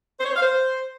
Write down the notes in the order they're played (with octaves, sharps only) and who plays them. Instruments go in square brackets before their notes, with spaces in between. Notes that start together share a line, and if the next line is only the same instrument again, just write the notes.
[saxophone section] C5
C#5
C5
F5
C5